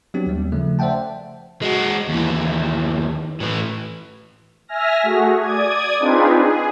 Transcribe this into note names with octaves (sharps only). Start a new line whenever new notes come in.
F#3 B3 C4 D4 G4
D#2 G3
C#3 F3 A3
C5 D5 E5 F#5 G5 A5
G#3 F#4
D#2 E3
A2 E3
E5 G#5 F6 A#6
A3 F#4 G#4
D5 D#6 G#6
C4 D4 D#4 F4 G#4 B4
G#4